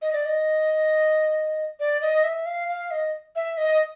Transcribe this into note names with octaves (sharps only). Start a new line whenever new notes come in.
D#5
D5
D#5
D5
D#5
E5
F5
F5
D#5
E5
D#5